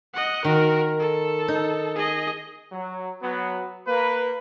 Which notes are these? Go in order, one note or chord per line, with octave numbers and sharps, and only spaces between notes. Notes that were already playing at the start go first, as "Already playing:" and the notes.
D#5 F#5
D#3 F#4 A#4
A4
D#4
G#4 D#5
F#3
F#3 B3
A#3 B4